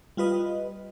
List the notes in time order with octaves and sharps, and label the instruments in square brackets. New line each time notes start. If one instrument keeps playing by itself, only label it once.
[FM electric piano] G3 F4 B4 D#5